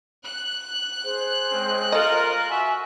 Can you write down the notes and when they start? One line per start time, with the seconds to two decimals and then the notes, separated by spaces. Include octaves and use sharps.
0.22 F#6
1.04 G#4 C5
1.50 G#3 C4 C#4
1.92 F4 A4 A#4 D#5
2.50 F#4 E5 G#5 C#6